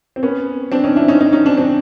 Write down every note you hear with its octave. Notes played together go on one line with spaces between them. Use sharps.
C4
B3 C#4
C4 D4
C#4 D#4
D4 E4
C#4 D#4
C#4 D#4
C#4 D#4
C4 D4
C4 D4